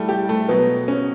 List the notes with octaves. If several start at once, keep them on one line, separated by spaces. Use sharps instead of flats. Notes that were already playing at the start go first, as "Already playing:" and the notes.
Already playing: G3 A3 E4
G4
A3
B2 F#3 B3
C#4